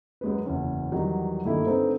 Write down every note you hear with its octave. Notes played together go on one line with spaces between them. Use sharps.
F#2 G#3 B4
F#1 E2 C#4
E2 D#3 F#3 G3
G2 D#3 A3 A#3 E4
D3 A3 C4 D#4 B4